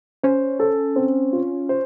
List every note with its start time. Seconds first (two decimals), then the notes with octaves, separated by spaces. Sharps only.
0.23 C#4 C5
0.60 A4
0.96 C4
1.33 F4
1.69 C5